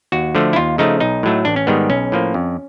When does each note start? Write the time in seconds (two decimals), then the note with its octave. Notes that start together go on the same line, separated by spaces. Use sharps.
0.12 D#2 F#4
0.35 D3 F3 A3
0.53 E4
0.56 D#2 F4
0.78 C#3 F3 A3 D#4
1.00 B1 D#4
1.23 A2 F#3 A3
1.45 A1 D4
1.56 C#4
1.67 G#2 D#3 G3 B3
1.90 B1 C#4
2.12 A2 F3 A#3
2.34 F2